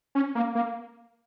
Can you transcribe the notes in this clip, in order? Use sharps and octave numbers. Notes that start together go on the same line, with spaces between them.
C#4
A#3
A#3